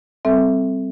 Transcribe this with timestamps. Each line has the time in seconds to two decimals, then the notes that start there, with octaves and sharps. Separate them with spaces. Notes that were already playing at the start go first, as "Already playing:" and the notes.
0.25 G3 C4 A4 E5